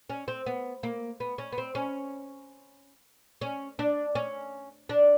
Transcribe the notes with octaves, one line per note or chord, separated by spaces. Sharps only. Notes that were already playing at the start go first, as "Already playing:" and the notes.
C#4
C4
B3
A#3
B3
C#4
B3
C4
C#4
C#4
D4
C#4
D4